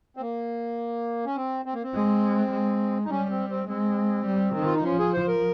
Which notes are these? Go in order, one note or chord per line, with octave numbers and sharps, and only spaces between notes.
C4
A#3
C#4
C4
C4
A#3
C4
G#3
G#3
D#4
G3 C#4
C4
C4
G#3 C4
G3
D#3
F4
D#4
F3 C#4
G#4
C5
A#4